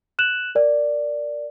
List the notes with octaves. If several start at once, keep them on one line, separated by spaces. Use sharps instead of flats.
F#6 E7 F#7
A#4 D5